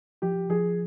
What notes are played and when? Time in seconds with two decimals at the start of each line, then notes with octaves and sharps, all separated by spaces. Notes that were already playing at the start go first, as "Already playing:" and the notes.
0.22 F3 G4
0.50 F3 G#4